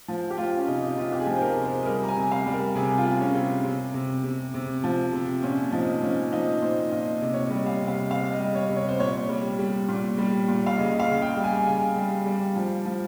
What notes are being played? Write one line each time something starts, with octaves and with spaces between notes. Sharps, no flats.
F3
G4
F3 F4
C#4
C3 D#4
D#4
C3 F4
G4
G#4
F3
C5
A#4
C3
C5
G#4
G3 A#4
A#5
G#5
C3
F5
G3
A#4
C3 G#4
F4
C3
C#4
C3
C3
C3
C3
C3
F3
C3
A#2 C#4
F3 D#4
F3 C#4
F3 D#4
A#2 C5
A#2 D#5
C3
C#5
D#5
G3
F5
C3
F5
C3 F5
D#5
G3
C#5
C3
C#5
C5
A#2 C#5
G3
G3
A#2
G3
A#2
F5
C#3 D#5
F5
C#3
G5
G3
G#5
C#3 G#5
G3
G3
F3
F3